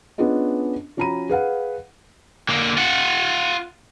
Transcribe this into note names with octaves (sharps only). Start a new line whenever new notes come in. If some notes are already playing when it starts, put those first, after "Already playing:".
B3 C#4 D4 F4 G#4 D#5
F3 C#4 F#4 A#5 B5 D#7
G#4 B4 F5 F#5
D3 A#3
F4 F#5